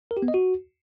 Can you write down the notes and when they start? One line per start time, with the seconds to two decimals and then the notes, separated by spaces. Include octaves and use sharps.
0.11 A#4
0.17 G4
0.22 B3
0.28 D#5
0.34 F#4